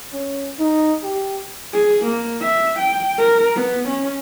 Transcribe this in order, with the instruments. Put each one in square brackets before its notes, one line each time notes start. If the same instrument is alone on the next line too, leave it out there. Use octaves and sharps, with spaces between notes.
[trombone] C#4
D#4
G4
[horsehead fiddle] G#4
A#3
E5
G5
A#4
B3
C#4